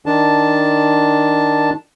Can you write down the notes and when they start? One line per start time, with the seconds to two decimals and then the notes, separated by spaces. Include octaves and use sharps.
0.06 D#3 D4 A5